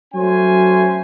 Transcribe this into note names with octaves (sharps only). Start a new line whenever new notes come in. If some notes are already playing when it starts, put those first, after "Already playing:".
F#3 A3 C#4 C5 G#5